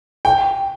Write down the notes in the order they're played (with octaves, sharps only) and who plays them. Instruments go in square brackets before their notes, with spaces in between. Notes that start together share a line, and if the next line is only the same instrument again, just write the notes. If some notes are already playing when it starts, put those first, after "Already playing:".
[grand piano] G5